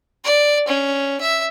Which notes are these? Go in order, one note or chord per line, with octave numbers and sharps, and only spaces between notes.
D5
C#4
E5